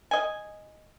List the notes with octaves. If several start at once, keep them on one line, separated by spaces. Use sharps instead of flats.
D#5 G#5